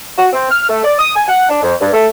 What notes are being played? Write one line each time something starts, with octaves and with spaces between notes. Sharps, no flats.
F#4
C4
F6
A3
D5
D#6
G#5
F#5
D4
F2
G2
A3